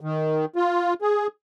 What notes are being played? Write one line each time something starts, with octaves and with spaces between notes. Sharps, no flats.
D#3
F4
G#4